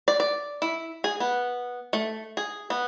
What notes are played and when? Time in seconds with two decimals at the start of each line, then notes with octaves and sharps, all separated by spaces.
0.08 D5
0.20 D5
0.62 E4
1.04 G#4
1.20 B3
1.93 A3
2.37 G#4
2.70 B3